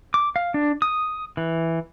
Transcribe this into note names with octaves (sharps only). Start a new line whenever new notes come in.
D6
F5
D4
D#6
E3